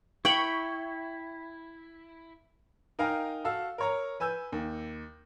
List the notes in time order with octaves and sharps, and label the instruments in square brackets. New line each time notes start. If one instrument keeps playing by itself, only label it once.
[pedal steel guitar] E4 [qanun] G5 B5 [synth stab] C#6
[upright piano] D#4 A#4 F5 G5 G#5 A#5
F#4 A4 F5 E6
A#4 C#5 A#5
B4 G#5 E6 G6
D#2